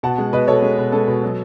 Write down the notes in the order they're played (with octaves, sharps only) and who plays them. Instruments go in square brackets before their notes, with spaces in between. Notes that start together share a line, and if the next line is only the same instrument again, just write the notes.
[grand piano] B2 F#5 A5
G#3
B2 B4 D#5
B2 A4 C#5
G#3
B2
G#3 A4
B2
F#3